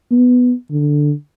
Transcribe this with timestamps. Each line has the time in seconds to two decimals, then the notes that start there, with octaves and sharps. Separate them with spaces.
0.12 B3
0.71 D3